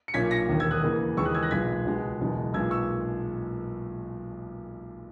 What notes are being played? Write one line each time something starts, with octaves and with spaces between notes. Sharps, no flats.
C#7
B1 A#2 A#3 C#4 G#6 B6
A#6 C#7
E1 D#2 D#3
E6 G#6
D#6 F#6
E2 C#3 E3 A#3
D#2 C#3 E3 G#3 C#6 E6
D#6 F#6
E6 G#6
F#6 A#6
B1 A#2 G#3 B3 G#6 B6
C#2 B2 G#3 B3
F#1 E2 B2 G#3
B1 A#2 G#3 B3 E6 G#6
C#6 E6